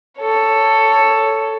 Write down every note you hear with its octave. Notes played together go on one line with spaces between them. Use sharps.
A4 C#5